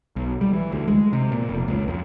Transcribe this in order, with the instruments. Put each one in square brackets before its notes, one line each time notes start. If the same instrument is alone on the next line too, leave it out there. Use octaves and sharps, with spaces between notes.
[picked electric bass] B1
G3
E3
D2
G#3
C3
A#2
F1
C#2
F2